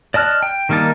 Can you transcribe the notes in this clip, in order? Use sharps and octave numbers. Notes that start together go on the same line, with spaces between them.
D5 D#5 A5 F6 F#6
G5
D#3 G3 A#3 D#4 A5